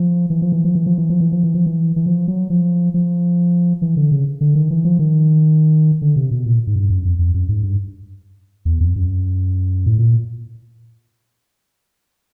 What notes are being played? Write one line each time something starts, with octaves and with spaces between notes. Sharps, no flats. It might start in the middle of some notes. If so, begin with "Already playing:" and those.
Already playing: F3
E3
F3
E3
F3
E3
F3
E3
F3
E3
F3
E3
F3
E3
E3
F3
F#3
F3
F3
E3
D3
C#3
D3
D#3
E3
F3
D#3
D3
C3
B2
A#2
G#2
G2
F#2
F2
F2
F#2
G#2
G2
E2
F2
F#2
A2
A#2